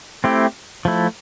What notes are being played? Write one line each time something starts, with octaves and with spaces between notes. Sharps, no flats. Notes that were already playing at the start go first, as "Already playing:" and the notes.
A3 C4 E4 G4
F3 A3 E4